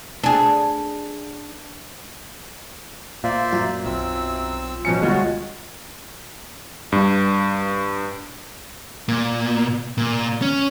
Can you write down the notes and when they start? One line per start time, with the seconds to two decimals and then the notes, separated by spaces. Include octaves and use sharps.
0.24 D4 G#4
3.24 A#2 C5 D5 E5 F5
3.53 F#2 F4
3.85 B1 C4 E6
4.85 B2 F3 C#4 C#7
5.02 D2 E3 G3 G#3 F4 F#4 C#5
6.92 G2
9.08 A#2
9.98 A#2
10.42 C#4